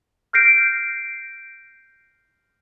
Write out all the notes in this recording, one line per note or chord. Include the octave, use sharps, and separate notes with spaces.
F6 G6 A#6 C7 D7